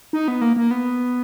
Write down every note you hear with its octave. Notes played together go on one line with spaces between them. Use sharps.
D#4
B3
A#3
A#3
B3